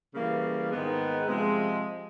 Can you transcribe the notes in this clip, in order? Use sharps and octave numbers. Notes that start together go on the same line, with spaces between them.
C#3 E3 G3 A#3
G#2 D#3 G#3 B3
C3 F3 G#3